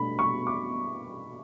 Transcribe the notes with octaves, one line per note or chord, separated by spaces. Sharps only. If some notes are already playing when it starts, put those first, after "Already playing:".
Already playing: B2 A3 D4 B5
C#6
D6